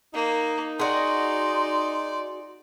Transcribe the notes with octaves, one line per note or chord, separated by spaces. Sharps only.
A#3 D#4
F#4 G#4 D5 C6